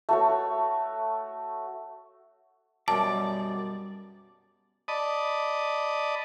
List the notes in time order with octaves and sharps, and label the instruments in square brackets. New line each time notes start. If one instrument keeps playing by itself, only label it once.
[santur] A3 F#4 C#5
[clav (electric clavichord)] F#2 [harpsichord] B2 G3 [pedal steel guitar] D5 [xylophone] A5
[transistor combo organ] D5 D#5 A5 B5 D#6